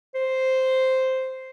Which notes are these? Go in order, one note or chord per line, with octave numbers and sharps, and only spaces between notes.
C5